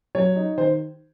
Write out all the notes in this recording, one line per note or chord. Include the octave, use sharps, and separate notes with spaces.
F#3 C#5
D#4
D#3 C5